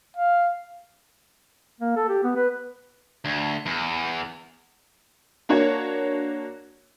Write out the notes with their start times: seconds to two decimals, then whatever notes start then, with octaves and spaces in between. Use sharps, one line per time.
0.17 F5
1.80 A#3
1.96 A4
2.09 G4
2.23 B3
2.36 B4
3.25 D2
3.66 E2
5.49 A#3 D4 F#4 C#5 G#6